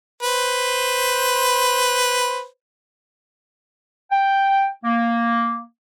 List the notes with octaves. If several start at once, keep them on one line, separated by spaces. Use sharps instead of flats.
B4 C5
G5
A#3